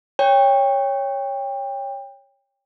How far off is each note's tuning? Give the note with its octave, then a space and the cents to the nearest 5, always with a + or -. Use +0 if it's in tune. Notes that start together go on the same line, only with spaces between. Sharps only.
C#5 +0 G5 +25